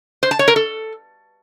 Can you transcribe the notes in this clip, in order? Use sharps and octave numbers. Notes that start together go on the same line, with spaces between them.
C5
A5
C#5
A#4
A4